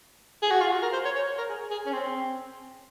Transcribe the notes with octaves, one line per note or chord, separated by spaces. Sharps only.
G#4
F#4
F4
F#4
A#4
C5
C#5
C#5
C#5
A#4
G#4
G#4
C#4
C4